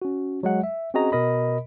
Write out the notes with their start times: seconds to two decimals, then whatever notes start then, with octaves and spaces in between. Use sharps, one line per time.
0.02 C#4 F#4
0.43 F#3 G#3 F#5
0.64 E5
0.94 C4 C#4 F#4 G#4 D#5 A#5
1.12 B2 A#4 D#5 B5